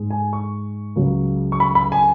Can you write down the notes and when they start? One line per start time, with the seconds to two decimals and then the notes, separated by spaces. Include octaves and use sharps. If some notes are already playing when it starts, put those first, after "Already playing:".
Already playing: G#2 G#3
0.11 G#5
0.33 C#6
0.96 C#2 C#3 F#3
1.52 C#6
1.60 B5
1.75 B5
1.92 G#5